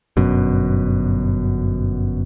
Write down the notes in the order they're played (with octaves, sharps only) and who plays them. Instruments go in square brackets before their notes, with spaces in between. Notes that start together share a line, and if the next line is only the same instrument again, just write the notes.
[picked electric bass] G1 F#2 B2